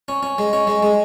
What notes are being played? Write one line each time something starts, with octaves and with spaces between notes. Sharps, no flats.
C#4
C#4
G#3
C#4
G#3
G#3